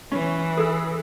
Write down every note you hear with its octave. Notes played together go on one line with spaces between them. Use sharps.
E3 C#4
G#4 A4 E6